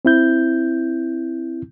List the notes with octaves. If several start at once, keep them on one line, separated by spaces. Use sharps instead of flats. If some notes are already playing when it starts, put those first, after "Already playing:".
C4 E4 G6